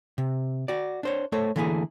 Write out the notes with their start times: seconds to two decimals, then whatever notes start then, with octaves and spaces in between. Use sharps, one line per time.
0.18 C3
0.68 F#4 D5
1.03 D4 C5 C#5
1.32 A3 A4 C5 C#5
1.56 D3 E3 A3 A#3 E4 G#4